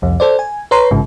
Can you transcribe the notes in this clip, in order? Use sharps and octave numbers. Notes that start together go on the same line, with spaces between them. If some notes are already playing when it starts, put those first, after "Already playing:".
C2 F2
A4 C5 D5
G#5
B4 C#5 A#5 C6
A1 G#2 C#3